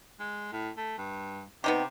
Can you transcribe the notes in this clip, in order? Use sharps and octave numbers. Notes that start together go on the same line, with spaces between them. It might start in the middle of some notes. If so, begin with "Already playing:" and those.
G#3
A2
A3
G2
C3 B3 D#4 G4